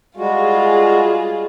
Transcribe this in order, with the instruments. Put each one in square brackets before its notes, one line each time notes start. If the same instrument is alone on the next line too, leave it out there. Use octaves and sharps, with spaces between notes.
[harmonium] G3 G#3 F#4 [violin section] F4 G#4